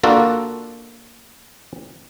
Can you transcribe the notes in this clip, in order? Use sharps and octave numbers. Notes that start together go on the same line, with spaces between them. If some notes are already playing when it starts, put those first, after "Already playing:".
A#3 D4 F4 F#4 A4